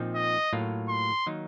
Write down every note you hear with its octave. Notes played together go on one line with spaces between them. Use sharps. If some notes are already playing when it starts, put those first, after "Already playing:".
Already playing: A#2 F3 C4 D#4
D#5
A2 F#3 A#3 F4
C6
D#3 F#3 A#3 D#4